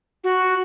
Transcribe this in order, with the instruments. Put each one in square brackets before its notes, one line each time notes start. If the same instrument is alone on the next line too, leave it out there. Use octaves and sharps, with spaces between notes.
[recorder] F#4